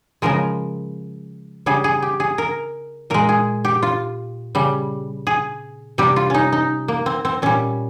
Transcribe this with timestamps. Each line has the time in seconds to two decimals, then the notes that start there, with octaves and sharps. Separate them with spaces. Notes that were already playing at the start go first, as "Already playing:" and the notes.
0.22 C#3 F3 G#3 A#4
1.66 C#3 G3 G#4
1.84 G#4
2.02 G4
2.20 G#4
2.38 A#4
3.10 A#2 G#3 A#4
3.29 G#4
3.65 G4
3.82 F4
4.55 C#3 G3
5.27 G#4
5.98 C3 G3 G4
6.16 F4
6.30 C#4 D#4
6.52 D#4
6.88 A#3
7.06 C4
7.25 C4
7.42 A#2 G3 C#4